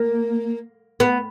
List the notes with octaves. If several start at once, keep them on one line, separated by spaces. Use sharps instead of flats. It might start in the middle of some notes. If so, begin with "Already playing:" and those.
Already playing: A#3
B3